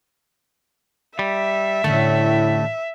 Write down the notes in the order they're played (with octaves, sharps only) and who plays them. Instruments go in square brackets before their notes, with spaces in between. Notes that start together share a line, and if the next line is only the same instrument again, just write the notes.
[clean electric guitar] G3 [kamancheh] E5
[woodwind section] A2 [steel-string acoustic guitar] D3 G3 C#4 [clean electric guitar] A3